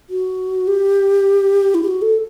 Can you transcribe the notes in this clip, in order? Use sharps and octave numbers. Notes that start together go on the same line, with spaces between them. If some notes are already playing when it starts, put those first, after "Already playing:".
F#4
G4
E4
G4
F#4
A4